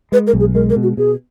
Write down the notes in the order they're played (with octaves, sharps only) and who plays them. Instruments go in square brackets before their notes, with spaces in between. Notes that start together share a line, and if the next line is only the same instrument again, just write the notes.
[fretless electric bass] G#3 [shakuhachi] B4
[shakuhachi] A#4
[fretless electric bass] B1
[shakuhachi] G#4
[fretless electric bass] G#3 [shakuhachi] A#4
[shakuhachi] A#4
[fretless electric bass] B2
[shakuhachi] F#4
[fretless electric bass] B2 [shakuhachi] G#4